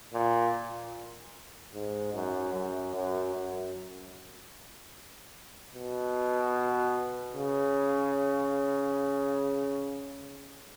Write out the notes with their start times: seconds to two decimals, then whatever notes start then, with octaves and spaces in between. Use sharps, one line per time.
0.13 A#2
1.74 G#2
2.14 F#2
2.54 F#2
2.94 F#2
3.34 F#2
5.75 B2
7.35 C#3